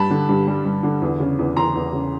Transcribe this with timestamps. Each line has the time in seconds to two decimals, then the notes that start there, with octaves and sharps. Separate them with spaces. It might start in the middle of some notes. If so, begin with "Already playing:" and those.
Already playing: G2 A5 B5
0.10 D3
0.29 G2
0.47 G3
0.65 G2
0.83 D3
1.02 E2
1.20 C#3
1.39 E2
1.56 E3 A#5 C6
1.75 E2
1.93 C#3